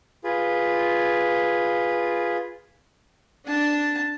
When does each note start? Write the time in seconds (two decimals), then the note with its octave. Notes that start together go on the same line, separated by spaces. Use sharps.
0.24 F4 G#4 B4
3.46 D4 A5